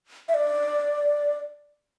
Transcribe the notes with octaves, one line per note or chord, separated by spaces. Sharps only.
E5
D5